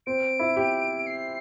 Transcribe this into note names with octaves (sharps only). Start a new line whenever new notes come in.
C4 D7
E4
G4
C7